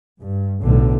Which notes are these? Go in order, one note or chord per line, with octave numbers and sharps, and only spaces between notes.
G2
B1 A2 D3